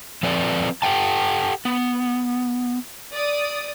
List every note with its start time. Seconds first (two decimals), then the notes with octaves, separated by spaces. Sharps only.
0.23 F3 C4 A4 B4 D5
0.82 G4 A4 F#5 G5 A5
1.65 B3
3.12 D5 D#6